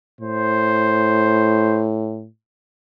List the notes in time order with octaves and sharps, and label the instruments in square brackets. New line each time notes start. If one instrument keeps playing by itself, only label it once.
[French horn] A2 [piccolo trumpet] C5